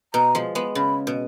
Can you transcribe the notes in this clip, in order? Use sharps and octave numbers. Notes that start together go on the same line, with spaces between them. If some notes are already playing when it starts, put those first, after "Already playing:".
B2 A#5
F3 G#3
G#3 B3
C#3 B5
B2